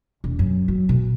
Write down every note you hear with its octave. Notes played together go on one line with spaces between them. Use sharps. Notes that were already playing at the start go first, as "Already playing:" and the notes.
E1
F#2
F#3
B2